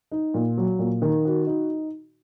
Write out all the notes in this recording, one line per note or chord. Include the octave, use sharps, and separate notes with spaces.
D#4
A#2
F#3
A#2
D#3
F#4
D#4